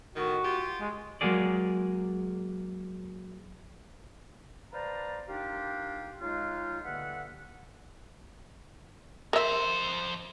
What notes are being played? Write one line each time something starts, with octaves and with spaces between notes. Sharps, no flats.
A2 D#3 F#4
F4 G4
G#3
F#3 G#3 A#3 F#4 G#4 D5
B4 C5 D5 F5 A5 A#5
A#3 D4 D#4 F4 G4
C#3 G#3 D#4 F4
G2 D3 A#3 E5 F#5
F2 A#4 C5 E5